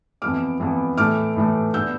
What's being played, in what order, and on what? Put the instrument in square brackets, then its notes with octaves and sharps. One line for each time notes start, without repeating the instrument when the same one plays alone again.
[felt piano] F2 E3 B3 D6 F6
F2 E3 B3
A2 E3 A3 D6 F6
A2 E3 A3
B2 B3 D4 E6 G6